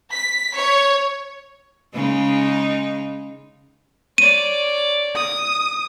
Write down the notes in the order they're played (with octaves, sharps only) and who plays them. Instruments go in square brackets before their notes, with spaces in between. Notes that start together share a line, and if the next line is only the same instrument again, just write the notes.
[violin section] B6
C#5
[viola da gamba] C#3 G#3 D#4
[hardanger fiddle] C#5 D5 [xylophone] D#7
[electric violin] D#6